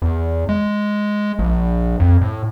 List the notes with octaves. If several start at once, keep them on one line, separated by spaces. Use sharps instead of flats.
E2
G#3
A#1
F2
A2